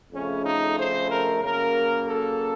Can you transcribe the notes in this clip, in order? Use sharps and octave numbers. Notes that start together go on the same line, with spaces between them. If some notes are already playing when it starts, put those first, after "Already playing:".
F2 C#3 A3 C#4
D#4
C5
A#4
C#3 F#3 A#3 A#4
A4